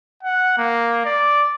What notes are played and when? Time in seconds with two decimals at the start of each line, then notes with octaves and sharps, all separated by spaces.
0.23 F#5
0.57 A#3
1.05 D5